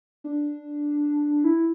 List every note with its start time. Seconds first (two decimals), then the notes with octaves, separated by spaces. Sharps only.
0.24 D4
1.44 E4